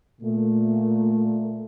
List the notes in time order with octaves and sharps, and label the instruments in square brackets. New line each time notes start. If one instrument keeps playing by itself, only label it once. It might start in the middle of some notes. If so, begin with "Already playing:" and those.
[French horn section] A#2 A3